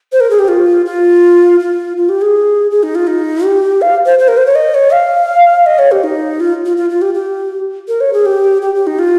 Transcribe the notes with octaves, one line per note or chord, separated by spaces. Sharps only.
C5
A#4
G#4
G4
F4
F4
F4
F4
G4
G#4
G#4
D#4
F4
D#4
G4
F5
C5
C5
A#4
C5
C#5
D#5
C#5
F5
D#5
C#5
G4
D#4
F4
F4
F4
F4
G4
G4
A#4
C#5
G#4
G4
G4
G4
D#4
F4